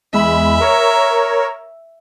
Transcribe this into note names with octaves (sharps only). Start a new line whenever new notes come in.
E2 G#3 E5 B5
A#4 C#5 A#5